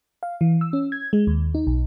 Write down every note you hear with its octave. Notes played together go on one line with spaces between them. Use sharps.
F5
E3
E6
C#4
G#6
G#3
D#2
D#4
B1